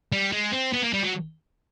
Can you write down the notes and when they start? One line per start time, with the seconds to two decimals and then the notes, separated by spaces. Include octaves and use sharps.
0.13 G3
0.33 G#3
0.52 C4
0.73 B3
0.83 A#3
0.93 G3
1.03 F#3